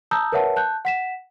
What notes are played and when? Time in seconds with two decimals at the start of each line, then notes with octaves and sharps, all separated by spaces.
0.11 A5 A#5 D#6 E6 G6
0.32 A#4 B4 C#5 E5 F#5 A5
0.56 A5 F#6 G6
0.85 F#5 B6 E7